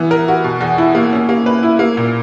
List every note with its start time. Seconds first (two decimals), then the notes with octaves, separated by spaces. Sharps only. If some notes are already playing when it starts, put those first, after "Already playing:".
Already playing: E3 B3
0.11 A#4
0.28 F#4
0.44 B2
0.61 E2
0.78 E4
0.95 A#3
1.13 C#4
1.29 A#3
1.46 B4
1.63 E4
1.79 A#3
1.97 A#2